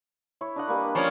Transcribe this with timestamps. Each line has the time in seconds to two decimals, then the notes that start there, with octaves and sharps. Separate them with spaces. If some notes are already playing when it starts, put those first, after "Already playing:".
0.41 E4 C#5
0.56 D4 D#5 F#5
0.67 G3 A#3 B4
0.95 F3 C#4